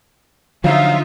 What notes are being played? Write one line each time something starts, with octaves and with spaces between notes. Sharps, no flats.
D3 F3 F#3 D#4 F4 E5 F5